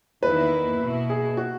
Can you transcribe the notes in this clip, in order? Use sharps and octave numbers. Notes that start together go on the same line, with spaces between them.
E2 D#3 A#3 E4 B4
B2 A#3 E4
G#4
F#4